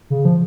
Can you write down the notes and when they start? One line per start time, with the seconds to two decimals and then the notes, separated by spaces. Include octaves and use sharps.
0.10 C#3
0.25 F3